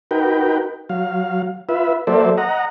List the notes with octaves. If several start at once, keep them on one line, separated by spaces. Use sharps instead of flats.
D#4 F#4 A#4 B4 G5
F#3 F5
F4 B4 E5
F#3 A#3 A4 C5 D5 E5
D#5 F#5 A#5